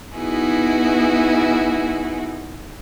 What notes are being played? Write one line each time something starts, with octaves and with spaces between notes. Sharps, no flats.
B3 D#4 E4 F#4 G#4